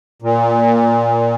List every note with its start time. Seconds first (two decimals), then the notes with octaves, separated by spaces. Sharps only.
0.22 A#2